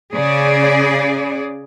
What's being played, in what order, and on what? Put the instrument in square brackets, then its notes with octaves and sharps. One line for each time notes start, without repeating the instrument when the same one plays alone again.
[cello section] C#3 G#4 D5